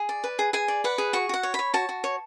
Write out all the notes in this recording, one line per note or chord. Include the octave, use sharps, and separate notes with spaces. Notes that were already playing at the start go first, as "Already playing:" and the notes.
Already playing: G#4
D5
B4
G#4
G#4 G#5
D5
B4 F#5
G#4
F#4 C#6
F#4 F#5
C#5
C#5 B5
F#4 A5
F#4
C#5